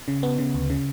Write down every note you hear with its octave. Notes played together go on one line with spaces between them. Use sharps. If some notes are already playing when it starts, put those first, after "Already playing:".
C#3
B3
C#3
D2
C#3